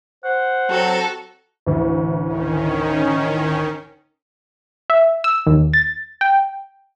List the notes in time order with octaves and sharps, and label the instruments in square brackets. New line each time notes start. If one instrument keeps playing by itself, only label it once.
[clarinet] C5 [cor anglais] F#5
[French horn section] F#3 C4 [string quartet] F#4 A4 A#5
[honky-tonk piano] A1 D2 E3
[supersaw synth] D#3 C#4
[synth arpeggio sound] E5
E6
D#2
A6
G5